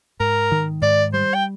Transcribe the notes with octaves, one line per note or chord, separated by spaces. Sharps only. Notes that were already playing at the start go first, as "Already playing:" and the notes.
G#2 A#4
D#3
G#2 D5
G3 C5
G5